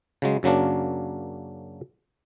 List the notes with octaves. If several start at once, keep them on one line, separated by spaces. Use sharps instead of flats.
C#3 F#3 G#3
F#2 C#3 F#3 A#3 D4